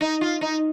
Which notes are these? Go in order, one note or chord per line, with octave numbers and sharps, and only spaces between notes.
D#4
F4
D#4